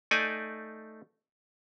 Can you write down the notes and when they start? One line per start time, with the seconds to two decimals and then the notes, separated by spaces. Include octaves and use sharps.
0.11 A3 D#4 D5 G#5